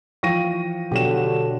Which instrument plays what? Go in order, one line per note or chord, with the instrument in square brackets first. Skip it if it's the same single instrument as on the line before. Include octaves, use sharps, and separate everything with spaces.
[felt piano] E3 F3 G5 [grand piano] C#6 A#6 D#7
[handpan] B2 F#3 F#4 [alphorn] D3 [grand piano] G4 E7